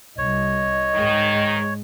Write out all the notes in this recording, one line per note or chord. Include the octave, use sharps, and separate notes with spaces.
C2 C#5 D#5
G#2 D#3 G#3